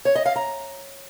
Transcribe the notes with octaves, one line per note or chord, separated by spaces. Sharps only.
C#5
D#5
F5
A#5